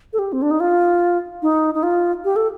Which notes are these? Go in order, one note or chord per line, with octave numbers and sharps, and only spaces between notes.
A4
G4
C4
D4
D#4
F4
D#4
D#4
F4
G4
A4